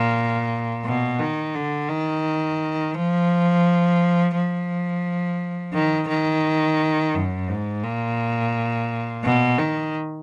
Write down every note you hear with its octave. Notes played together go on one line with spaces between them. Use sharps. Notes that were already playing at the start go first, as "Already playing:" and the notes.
Already playing: A#2
B2
D#3
D3
D#3
F3
F3
D#3
D#3
F#2
G#2
A#2
B2
D#3